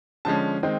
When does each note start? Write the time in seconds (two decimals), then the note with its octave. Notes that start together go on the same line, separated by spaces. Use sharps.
0.25 D3 F3 G#3 C#4 A5
0.63 D#3 G#3 C4 D#4